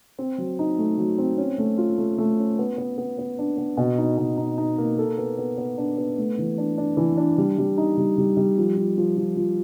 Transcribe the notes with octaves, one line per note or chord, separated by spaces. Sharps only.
C4
F#3
D#4
A3
F#3
C4
C#4
A3
F4
A3
A3
C#4
B3
B3
B3
B3
D4
B3
B2
D#4
B2
D#4
D#4
A#3
A4
B3
B3
B3
D4
B3
A3
E3
D4
D4
E3
D4
G3
G3
D#4
G3
G3
G3
F3
F3
F3
F3
F3